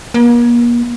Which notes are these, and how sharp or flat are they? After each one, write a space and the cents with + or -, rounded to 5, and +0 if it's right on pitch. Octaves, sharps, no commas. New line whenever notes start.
A#3 +40